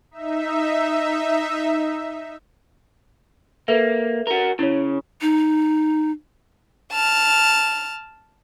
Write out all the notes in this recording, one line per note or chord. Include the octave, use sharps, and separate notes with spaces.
D#4 E5
A#3 A4 B4 E5
F#4 A#4
C#3 E4 C#5
D#4
A5 F6